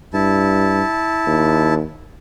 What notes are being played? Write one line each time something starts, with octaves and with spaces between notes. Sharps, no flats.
G2 E4 A5
D#2